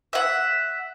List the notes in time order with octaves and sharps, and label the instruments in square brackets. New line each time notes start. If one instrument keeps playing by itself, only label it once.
[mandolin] E5 F#5